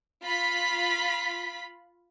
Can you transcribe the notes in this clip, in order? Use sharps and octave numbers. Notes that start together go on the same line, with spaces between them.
F4 B5 B6